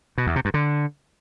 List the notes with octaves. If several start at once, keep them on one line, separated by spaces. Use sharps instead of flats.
B2
E2
C3
G2
D3